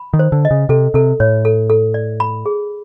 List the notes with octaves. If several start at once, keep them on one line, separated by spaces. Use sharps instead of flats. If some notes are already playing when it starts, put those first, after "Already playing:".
Already playing: B5
D#3
C5
D3
D#5
C#3
C3 A4
C3 A4
A2 C#5
A4
A4
D5
B5
G#4